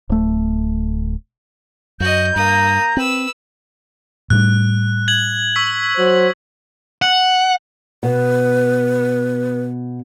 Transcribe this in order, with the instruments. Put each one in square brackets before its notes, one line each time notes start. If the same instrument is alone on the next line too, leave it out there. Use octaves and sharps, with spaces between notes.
[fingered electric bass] D1 A3
[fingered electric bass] F#2 [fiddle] F#4 D#5 [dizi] G6
[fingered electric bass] G2 [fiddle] A#3 D#6 [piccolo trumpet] A#5
[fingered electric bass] C4 [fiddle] B4 E6
[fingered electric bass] A2 G3 [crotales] F#6
[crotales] G#6 F#7
C#6 E6 B6
[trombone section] F#3 C5
[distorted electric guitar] F#5
[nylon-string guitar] B2 [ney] B4